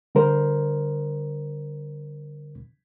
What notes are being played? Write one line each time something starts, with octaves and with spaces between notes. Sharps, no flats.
D3 G3 A#4 C5